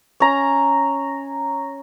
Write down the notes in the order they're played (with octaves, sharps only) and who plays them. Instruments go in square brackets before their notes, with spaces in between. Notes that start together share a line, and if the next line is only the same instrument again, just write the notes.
[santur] C#4 A#5